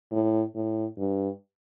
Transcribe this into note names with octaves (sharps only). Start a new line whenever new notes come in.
A2
A2
G2